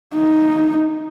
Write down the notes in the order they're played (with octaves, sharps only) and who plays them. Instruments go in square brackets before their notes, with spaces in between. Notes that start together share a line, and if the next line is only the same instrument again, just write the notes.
[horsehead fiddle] D#4